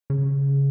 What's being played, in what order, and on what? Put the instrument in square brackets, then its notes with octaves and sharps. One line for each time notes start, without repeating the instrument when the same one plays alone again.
[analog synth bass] C#3